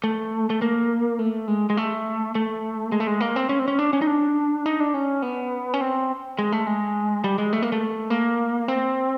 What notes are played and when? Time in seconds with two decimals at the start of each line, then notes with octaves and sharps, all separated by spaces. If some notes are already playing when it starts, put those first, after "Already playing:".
0.04 A3
0.50 A3
0.62 A#3
1.19 A3
1.48 G#3
1.70 G#3
1.77 A3
2.35 A3
2.92 G#3
3.00 A3
3.07 G#3
3.20 A#3
3.36 C4
3.49 C#4
3.59 C4
3.68 C#4
3.79 D4
3.93 C#4
4.02 D#4
4.07 D4
4.66 D#4
4.80 D4
4.94 C#4
5.22 B3
5.74 C#4
5.81 C4
6.39 G#3
6.52 A3
6.67 G#3
7.24 G3
7.38 G#3
7.53 A3
7.62 A#3
7.72 A3
8.10 A#3
8.68 C4